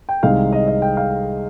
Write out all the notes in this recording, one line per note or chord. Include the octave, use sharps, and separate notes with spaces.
G5
C2 C3 D#3 G#3 F5
D#5
D#5
G5
F5